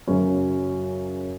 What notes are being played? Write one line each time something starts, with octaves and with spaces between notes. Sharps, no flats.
F#2 C#3 F#3 C#4